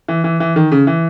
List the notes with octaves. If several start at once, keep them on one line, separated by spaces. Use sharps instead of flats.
E3
E3
E3
D#3
C#3
E3